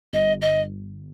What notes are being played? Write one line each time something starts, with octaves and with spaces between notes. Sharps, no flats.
G1 D#5
D#5